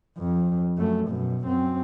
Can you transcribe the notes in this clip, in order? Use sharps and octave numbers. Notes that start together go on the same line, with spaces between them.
F2
F#2 A3
F#2 B2
F#2 C4